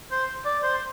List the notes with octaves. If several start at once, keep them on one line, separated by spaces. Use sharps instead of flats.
C5
D5
C5